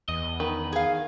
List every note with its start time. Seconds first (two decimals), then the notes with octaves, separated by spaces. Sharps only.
0.08 E2 D#5
0.40 D#3 B4
0.72 G#4 F5